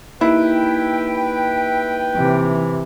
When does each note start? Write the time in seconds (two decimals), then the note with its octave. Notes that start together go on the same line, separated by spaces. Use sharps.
0.21 A#3 D#4 E4 G4 B4 G5
2.16 C3 E3